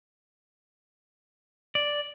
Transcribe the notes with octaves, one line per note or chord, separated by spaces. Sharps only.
D5